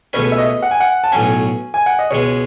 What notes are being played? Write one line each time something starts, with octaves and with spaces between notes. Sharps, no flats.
C#2 B2 A3 C#4 B4
E5
D#5
F#5
G#5
F#5
A5
B1 A2 F#3 C#4 G#5
G#5
F#5
D#5
C#2 B2 G#3 C#5